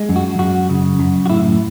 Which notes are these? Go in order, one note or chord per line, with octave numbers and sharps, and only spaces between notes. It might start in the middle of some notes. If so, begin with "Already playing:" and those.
Already playing: G#3
F#2
F#4
F#2 F#4
C#3
F#2
F#4
A2 E4